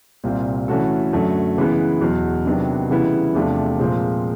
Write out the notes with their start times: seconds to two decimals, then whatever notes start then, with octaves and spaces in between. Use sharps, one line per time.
0.24 C2 A#2 G3 C4
0.68 E3 A3 C#4 F#4 A4
1.13 F#2 D3 F#3 A3
1.57 C#3 E3 G#3 B3
2.01 E2 B2 F#3
2.46 C3 D#3 F#3 B3 D4
2.90 C#3 E3 G3 B3 E4
3.35 E2 C3 F3 A3 D4
3.79 A#2 F3 G#3 C4